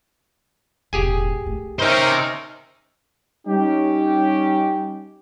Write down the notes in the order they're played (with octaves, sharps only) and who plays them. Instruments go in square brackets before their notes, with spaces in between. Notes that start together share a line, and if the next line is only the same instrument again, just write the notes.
[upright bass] E1 A1 [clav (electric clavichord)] G4 G#4 G#5
[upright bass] A3
[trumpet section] C#4 D#4 A#4 [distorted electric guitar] C5 E5
[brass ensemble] G3 C#4 D#4 G4